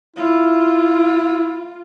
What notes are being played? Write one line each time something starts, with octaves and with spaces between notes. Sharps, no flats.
E4 F4